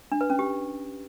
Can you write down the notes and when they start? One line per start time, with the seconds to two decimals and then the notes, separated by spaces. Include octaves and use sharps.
0.12 D4
0.21 B4
0.30 C#4
0.39 G4